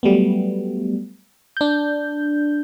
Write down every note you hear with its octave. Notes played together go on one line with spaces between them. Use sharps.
F#3 G3 A3 B3
D4 G6